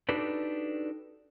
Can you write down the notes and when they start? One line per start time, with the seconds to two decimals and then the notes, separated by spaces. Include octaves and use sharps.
0.09 D4 D#4 F#4 G4 A4 B4